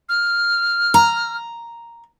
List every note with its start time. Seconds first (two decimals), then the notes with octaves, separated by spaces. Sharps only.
0.09 F6
0.94 A#5